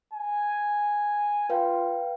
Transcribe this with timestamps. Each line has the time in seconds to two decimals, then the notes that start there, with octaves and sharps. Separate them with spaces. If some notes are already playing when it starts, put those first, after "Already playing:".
0.13 G#5
1.50 F4 B4 F5 G5